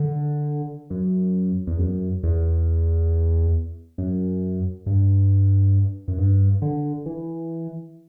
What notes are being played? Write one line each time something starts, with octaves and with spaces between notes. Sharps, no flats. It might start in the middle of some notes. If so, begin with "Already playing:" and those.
Already playing: D3
F#2
E2
F#2
E2
F#2
G2
F#2
G2
D3
E3